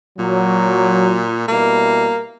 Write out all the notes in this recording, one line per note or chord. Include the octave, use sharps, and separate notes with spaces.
A#2 F#3
B2 G3 A#3 E4